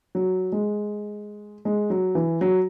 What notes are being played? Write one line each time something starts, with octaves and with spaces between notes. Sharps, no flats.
F#3
G#3
G#3
F#3
E3
F#3